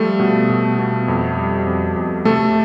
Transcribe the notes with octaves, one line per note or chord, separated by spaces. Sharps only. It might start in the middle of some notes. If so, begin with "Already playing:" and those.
Already playing: F3 G3 A3 A4
B2
B2
B2
F2
G3
F2
F2
C3 A3 A4